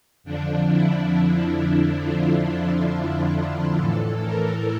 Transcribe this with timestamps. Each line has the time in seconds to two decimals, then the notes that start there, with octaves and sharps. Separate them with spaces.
0.24 F2 D3 F3 D4
0.69 E4
2.01 F4
3.76 A2 E3 A4
4.20 A#4